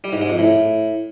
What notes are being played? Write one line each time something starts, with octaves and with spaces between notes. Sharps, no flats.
G3
G#2
G#3
F2
A2